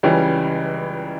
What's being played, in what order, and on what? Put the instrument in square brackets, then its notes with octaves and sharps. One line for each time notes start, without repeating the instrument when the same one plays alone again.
[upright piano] C#2 C#3 E3 G3 C#4